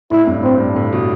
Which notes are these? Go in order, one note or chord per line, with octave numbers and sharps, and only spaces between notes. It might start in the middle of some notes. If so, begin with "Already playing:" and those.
A2 E4
G2
A2 C4
G2
A2
B2